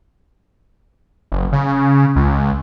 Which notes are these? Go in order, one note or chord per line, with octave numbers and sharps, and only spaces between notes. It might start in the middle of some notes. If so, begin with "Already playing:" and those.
F#1
C#3
C#2